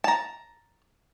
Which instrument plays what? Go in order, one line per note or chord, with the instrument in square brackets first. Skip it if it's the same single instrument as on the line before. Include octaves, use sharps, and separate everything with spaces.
[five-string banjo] A5 A#5